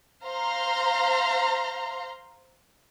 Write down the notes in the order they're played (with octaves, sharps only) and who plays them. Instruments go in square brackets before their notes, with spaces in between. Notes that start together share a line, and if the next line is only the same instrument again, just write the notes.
[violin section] C5 F5 A#5 C6